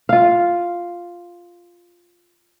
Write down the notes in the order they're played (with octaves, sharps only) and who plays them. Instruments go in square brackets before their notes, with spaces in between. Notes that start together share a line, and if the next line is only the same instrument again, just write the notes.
[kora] F4 F5